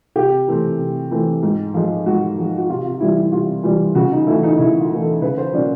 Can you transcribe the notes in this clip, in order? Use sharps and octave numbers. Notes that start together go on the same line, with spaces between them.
C3 G4
E3 A3 C4
C3
E3 A3 C4
G#2
F3 G#3
G#2 F#4
F3 G#3
F#4
C3 F4
F4
E3 G3 E4
E4
C3 F4
E3 G3
C#3 F#4
D#4
E3 A3 E4
D#4
C#3 E4
F4
E3 A3
A4
C#3 B4
C5
F#3 A#3 C#4 D5